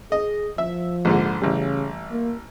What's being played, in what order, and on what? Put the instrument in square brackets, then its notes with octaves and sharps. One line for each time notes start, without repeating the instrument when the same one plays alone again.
[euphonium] G#4 [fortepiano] D#5
[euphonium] F3 [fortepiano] E5
[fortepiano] A#1 G#2 D3
[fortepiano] A1 G3 [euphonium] C#3
[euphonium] A#3